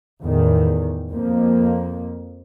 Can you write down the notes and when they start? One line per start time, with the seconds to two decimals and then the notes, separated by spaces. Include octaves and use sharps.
0.22 E2 A2 D#3
1.11 F2 F3 A#3